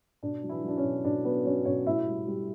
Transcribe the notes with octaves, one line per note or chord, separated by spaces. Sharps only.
B2 D4
F#3
E3 E4
F#3 D4
C#4
B2
B2 D4
F#3 B3 B4
F#3 C#4 C#5
B2 C#4 C#5
A2 E4 E5
G3
G3